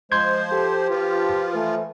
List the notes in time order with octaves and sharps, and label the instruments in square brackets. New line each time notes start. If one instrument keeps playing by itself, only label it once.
[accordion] F3 C5 [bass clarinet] G#3 [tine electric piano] C6 G6 G#6
[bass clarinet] G4 [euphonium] A4
[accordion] F3 F4 [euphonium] B4
[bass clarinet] E3 [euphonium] A3